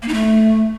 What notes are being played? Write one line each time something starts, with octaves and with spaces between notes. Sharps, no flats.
A#3
D#4
A3